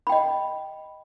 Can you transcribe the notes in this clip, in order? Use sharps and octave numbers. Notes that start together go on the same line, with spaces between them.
D#5 G5 B5